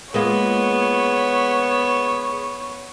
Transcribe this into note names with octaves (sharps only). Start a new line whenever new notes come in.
G#3 A#3 B3 F4 C#5